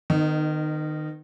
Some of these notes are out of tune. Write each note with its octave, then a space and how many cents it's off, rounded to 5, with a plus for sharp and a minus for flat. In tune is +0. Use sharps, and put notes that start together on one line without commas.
D#3 -25 B3 +30 D#4 +0